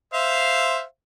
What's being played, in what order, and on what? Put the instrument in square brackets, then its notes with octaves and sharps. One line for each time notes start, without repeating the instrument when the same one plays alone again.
[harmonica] C5 E5 F5